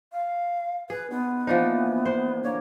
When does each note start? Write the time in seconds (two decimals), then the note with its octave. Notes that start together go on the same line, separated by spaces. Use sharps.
0.13 F5
0.90 G#4 B4
1.10 B3 D#4 F#4 C5
1.47 A#2 E3 F3 D4 D#4
2.05 C5
2.43 D3 A#3 A#4 C#5